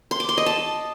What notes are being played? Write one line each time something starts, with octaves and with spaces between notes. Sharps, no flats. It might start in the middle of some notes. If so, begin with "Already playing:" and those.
C6
D6
C6
D#5
A5